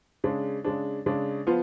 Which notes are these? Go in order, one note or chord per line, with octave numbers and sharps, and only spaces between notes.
C#3 G#3 D4
C#3 G#3 D4
C#3 G#3 D4
F3 B3 F4